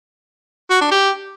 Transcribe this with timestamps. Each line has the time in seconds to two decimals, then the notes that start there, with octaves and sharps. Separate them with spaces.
0.71 F#4
0.81 D4
0.91 G4